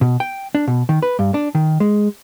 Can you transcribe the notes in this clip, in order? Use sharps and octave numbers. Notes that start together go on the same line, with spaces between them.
B2
G5
D4
B2
D#3
B4
G2
D4
D#3
G#3